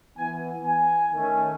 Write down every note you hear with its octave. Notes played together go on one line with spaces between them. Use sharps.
E3 B3 G#5
G#5
D#3 A3 C#4